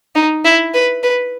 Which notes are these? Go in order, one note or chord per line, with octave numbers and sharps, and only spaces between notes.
D#4
E4
B4
B4